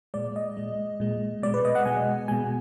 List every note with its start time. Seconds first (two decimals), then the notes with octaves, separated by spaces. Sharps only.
0.14 A#2 G#3 D5
0.36 D#5
0.57 A#2 G#3
1.00 A#2 G#3
1.42 B2 G#3 D5
1.54 B4
1.65 D#5
1.75 F#5
1.85 B2 G#3 G#5
2.28 B2 G#3 G#5